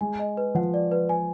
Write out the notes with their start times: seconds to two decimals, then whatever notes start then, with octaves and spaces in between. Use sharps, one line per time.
0.01 G#3 G#5
0.19 D#5
0.37 B4
0.55 F3 F#5
0.74 D5
0.91 B4
1.09 G#5